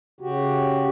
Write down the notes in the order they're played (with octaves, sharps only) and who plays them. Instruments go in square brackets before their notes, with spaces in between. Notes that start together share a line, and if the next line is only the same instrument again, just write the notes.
[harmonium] C#3 F#4 G4